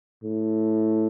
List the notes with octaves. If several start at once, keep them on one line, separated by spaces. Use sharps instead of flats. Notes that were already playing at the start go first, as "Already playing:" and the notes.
A2